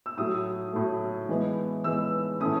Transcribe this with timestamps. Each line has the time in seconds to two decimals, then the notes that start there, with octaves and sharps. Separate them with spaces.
0.06 E6
0.17 A2 F#3 A3 D#6
0.73 A2 F#3 A3
1.29 E3 G#3 B3
1.84 E3 G#3 B3 E6
2.40 A2 E3 A3 C#4 D#6